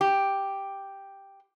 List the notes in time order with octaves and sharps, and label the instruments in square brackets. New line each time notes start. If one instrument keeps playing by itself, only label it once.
[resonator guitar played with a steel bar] G4